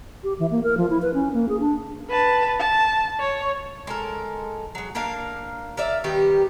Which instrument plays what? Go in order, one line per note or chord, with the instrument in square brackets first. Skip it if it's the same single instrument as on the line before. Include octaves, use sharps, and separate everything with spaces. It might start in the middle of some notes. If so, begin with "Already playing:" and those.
[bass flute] G4
E3
A#3
A#4
F3
E4
B4
C#4
A#3
G#4
D4
[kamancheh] B4 A5
A5
C#5
[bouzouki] G#3 A4 A#4
F#3 G#3
A#3 D4 A#4 F5
A#4 D5 E5 F5
D#3 G3 B3 G4